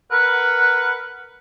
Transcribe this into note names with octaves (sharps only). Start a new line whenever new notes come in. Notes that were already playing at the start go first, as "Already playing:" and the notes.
A#4 B4 F#5